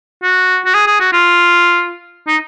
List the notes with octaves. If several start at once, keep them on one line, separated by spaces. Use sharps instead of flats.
F#4
F#4
G#4
G#4
F#4
F4
D#4